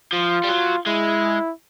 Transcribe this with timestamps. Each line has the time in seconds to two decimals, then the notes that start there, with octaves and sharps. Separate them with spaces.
0.13 F3 F4
0.44 G3
0.49 F#3
0.86 G#3 E4